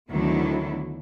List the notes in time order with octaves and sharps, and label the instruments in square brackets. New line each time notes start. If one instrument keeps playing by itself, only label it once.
[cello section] D2 D3 D#3 F#3 B3 E4